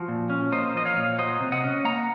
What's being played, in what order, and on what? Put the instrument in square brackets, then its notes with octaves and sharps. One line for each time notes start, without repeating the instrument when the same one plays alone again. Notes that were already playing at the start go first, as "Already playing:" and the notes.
Already playing: [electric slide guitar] F3 F#4
A#2
C#4
A#3 C5 D#5
F3 D#5
C#5 F5
A#2
F#3 C5 D#5
C3
D#5 F#5
C#4
A#3 F#5 A#5